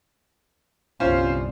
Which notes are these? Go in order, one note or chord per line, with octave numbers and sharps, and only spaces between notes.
G1 C2 C#4 F4 C5